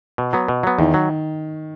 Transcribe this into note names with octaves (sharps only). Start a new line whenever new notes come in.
B2
F#3 B3
B2
F#3 B3
E2 D#3
F#3